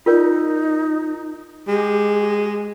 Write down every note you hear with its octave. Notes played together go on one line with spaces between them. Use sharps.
D#4 F4 A#4 D5
G#3 G4